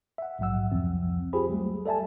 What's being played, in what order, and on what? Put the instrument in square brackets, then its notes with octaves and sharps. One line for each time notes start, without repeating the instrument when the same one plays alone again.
[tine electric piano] E5 F#5
A#1 G#2 F#3 F#5 E6
C2 F2 F3 C4
F4 G4 G#4 C5 B5
F#3 G3 A3
A4 D5 E5 G#5 A5